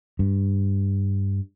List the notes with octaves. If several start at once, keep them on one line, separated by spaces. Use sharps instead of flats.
G2